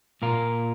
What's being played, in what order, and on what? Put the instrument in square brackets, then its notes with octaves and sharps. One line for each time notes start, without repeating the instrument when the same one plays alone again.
[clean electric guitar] A#2 A#3 F4 A#4